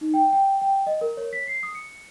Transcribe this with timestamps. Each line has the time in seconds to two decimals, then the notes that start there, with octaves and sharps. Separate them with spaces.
0.01 D#4
0.14 G5
0.33 G5
0.61 G5
0.87 D#5
1.01 A#4
1.17 C#5
1.33 B6
1.47 C7
1.63 D#6
1.75 C#7